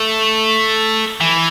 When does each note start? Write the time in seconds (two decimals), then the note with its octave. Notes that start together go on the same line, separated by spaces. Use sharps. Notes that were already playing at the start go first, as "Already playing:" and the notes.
Already playing: A3
1.21 E3